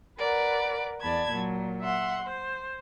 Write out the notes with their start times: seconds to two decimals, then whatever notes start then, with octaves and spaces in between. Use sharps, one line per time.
0.18 A#4 B4 D5 F#5
1.00 E2 D5 A5 B5 G#6
1.29 A#2 F#3
1.80 E5 F#5 C6
2.22 C5